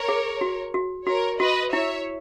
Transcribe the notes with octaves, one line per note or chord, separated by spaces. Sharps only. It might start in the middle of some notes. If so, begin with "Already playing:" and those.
Already playing: A#4 C#5
G#4
F#4
F#4
F#4 A#4 C#5
F#4 B4 D#5
E4 C#5 E5